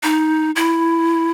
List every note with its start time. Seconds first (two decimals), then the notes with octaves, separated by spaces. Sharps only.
0.03 D#4
0.56 E4